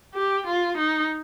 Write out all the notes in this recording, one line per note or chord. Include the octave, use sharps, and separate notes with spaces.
G4
F4
D#4